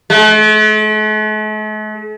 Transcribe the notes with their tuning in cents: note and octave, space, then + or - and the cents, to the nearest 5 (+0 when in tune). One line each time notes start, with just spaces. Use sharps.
A3 -45